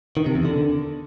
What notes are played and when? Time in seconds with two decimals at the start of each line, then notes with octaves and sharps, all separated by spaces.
0.17 D#3
0.26 C3
0.35 E2
0.45 D3